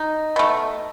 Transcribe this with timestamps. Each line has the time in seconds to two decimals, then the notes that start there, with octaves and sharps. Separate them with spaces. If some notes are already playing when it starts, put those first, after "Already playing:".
Already playing: D#4
0.36 B2 A3